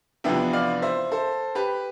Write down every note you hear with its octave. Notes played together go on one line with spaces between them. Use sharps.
F2 C3 E3 B3 D4 E5 G5
D5 F5
C5 E5
A4 C5
G4 B4